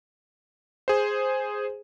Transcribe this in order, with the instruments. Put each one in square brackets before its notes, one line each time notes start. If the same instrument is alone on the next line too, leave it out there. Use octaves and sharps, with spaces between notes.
[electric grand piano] G#4 C5